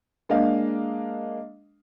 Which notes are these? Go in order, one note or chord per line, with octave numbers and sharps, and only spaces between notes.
G#3 A#3 D4 D#5 F5